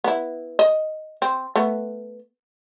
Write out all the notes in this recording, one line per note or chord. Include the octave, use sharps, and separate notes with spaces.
B3 E4
D#5
C4
A3 B3